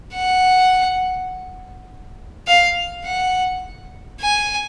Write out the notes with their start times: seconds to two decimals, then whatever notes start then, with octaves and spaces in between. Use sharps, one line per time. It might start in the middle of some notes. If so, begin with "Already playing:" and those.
0.14 F#5
2.47 F5
3.05 F#5
4.21 G#5